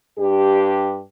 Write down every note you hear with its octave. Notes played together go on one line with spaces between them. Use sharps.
G2 D4 G4